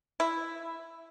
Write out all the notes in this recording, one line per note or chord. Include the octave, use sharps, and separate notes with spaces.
E4